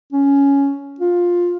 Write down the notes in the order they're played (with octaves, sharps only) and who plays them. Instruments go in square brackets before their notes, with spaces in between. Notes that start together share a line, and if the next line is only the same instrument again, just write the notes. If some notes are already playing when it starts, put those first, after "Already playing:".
[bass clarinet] C#4
F4